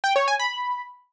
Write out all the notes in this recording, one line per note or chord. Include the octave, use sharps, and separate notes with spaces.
G5
C#5
G#5
B5